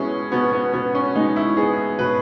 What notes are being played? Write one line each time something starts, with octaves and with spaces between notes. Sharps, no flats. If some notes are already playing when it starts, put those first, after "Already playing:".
Already playing: B2 G#3 B3 C#4 E4 G#4
B2 B3
B3
B2 B3
C#4
G#3 D#4
E4
B3 G#4
B2 B4